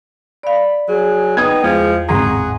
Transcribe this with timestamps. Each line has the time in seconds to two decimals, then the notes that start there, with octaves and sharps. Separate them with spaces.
0.43 D5 F5 B5
0.88 F#3 G#4
1.37 B3 D#4 G5 D#6 G#6
1.63 E2 F3 G#3
2.09 G#1 A2 G#4 F#5 A#5 C6